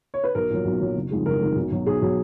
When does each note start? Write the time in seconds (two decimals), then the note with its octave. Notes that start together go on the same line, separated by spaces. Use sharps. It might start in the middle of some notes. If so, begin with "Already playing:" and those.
0.14 C#5
0.24 B4
0.35 B1 A#4
0.50 A#2 F#3
0.65 B1
0.81 A#2 F#3
0.95 F#1
1.11 F2 D#3 G#3
1.26 F#1 A#4
1.41 F2 D#3 G#3
1.56 B1
1.71 B2 F#3
1.86 B1 G#4
2.02 B2 F#3